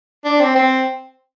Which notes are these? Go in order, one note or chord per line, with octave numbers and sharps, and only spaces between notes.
D4
C4
C4